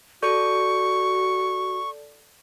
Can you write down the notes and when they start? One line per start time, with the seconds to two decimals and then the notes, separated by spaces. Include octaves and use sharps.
0.23 F#4 A4 D5 C#6 G6